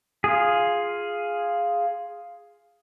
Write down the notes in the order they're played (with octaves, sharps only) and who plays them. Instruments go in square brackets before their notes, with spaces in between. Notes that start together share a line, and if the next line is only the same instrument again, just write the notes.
[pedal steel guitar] F4 G#4